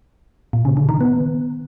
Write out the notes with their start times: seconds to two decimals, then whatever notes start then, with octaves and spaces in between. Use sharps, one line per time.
0.53 A#2
0.65 C#3
0.77 D3
0.89 D#3
1.01 B3